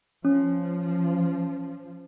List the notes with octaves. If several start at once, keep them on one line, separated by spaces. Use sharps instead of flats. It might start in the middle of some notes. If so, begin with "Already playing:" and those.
F3 C#4